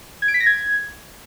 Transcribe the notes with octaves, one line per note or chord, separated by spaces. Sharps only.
G#6
D7
B6
A#6
G#6